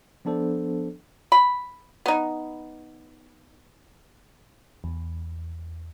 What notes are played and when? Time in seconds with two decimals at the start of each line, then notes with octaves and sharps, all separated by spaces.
0.25 F3 B3 D4 A4 C5
1.32 B5
2.06 B3 D#4
4.84 E2